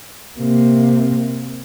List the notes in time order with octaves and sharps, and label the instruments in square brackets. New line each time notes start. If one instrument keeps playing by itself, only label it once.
[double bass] C3 A#3